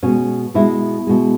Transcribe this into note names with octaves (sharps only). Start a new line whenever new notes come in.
B2 G#3 C#4
B2 G#3 E4
B2 G#3